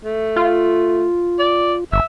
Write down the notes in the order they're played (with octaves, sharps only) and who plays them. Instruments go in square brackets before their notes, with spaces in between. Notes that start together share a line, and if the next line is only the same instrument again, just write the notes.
[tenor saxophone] A3
[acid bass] F4
[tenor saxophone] D5
[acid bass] G1 [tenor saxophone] E5